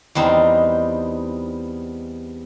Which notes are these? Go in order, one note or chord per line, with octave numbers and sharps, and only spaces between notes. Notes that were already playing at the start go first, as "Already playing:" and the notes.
E2 G3 C4 D#4